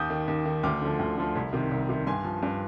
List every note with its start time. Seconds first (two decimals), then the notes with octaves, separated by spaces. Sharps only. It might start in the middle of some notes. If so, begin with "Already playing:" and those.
Already playing: D#2 D#6 G6
0.10 D#3
0.28 D#2
0.45 D#3
0.63 D2 D6 F6
0.82 D3 F3
0.99 D2
1.17 D3 F3
1.35 C2
1.53 C3 D#3
1.71 C2
1.89 C3 D#3
2.07 G2 G#5 C6
2.24 F3
2.43 G2